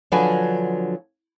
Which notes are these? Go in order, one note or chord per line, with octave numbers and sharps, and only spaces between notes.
D3 F3 F#3 D4 B4 G#5